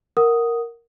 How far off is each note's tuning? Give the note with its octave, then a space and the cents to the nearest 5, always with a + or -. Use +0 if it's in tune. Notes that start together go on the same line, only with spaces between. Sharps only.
A#4 +0 F#5 +0 D#6 +0